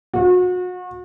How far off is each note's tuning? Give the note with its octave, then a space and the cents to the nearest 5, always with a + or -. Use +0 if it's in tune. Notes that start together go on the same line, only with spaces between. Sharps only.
F#4 -35